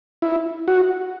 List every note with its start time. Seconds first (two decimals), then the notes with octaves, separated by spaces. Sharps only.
0.22 E4
0.68 F#4